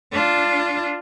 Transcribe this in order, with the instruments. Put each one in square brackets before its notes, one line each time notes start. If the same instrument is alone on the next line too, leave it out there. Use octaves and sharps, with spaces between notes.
[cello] D4 F4